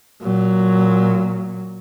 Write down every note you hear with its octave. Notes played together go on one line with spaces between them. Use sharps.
A#2 F#3